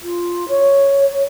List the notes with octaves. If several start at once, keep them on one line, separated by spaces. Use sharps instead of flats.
F4
C#5